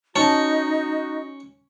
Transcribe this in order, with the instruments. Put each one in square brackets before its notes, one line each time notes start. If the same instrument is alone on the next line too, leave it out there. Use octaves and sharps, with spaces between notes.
[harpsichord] C#4 [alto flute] D#4 [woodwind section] F#4 [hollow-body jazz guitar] A5